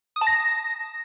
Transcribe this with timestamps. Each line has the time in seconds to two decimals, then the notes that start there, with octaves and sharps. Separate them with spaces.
0.16 D#6
0.21 A5
0.27 A#6